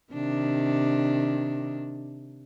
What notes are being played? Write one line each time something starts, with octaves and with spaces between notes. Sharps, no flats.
C3 D#3 D4